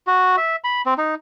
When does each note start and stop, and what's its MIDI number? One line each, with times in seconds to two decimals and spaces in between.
0.07 0.36 66
0.37 0.56 76
0.64 0.82 83
0.86 0.94 60
0.98 1.15 63